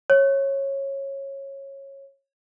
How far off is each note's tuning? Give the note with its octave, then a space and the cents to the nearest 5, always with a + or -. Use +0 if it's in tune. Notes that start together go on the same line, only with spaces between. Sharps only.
C#5 -15